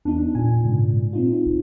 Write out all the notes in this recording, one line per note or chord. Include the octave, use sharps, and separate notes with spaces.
E2 B3 D4 D#4
A#2 G#5
G#2 C#3
C4 D#4 F4
C2